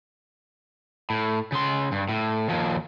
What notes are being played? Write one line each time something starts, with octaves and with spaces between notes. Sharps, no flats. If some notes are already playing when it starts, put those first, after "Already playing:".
A2
C#3 C6
G2
A2
D#2 F3